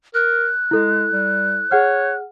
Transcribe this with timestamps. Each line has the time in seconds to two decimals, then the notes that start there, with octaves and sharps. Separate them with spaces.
0.15 A#4 F#6
0.71 G#3 E4 A4
1.12 G3
1.71 G#4 C#5 F#5 F6